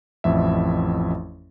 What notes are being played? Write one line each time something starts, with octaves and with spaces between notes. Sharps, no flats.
A1 F2 E5